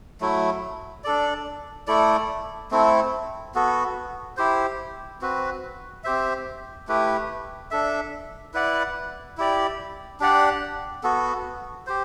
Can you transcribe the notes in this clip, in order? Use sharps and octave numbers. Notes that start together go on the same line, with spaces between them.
F#3 A3 E4
D4 A4 D5
A3 E4 A4 D5
A3 C4 E4 A4
B3 F#4 A4
E4 G4 C5
C4 F#4 B4
C4 G4 C5 E5
A3 E4 G4 B4
D4 A4 E5
E4 B4 D5 F#5
E4 G4 D5
D4 G4 D5 F#5
B3 F#4 A4
G4 C5